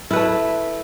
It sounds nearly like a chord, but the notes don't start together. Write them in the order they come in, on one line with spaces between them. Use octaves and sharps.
E4 B4 A3